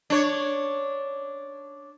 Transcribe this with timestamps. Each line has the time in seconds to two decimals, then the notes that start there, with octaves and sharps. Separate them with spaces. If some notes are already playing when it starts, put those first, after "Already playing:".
0.10 D4 C#5